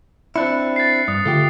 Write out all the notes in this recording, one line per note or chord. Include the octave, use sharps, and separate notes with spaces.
C4 D4 E4 F#6 C#7
A6 C7
G2 D#6
D3 A3 F4 G4